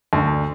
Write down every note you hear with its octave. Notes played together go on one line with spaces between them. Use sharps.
D2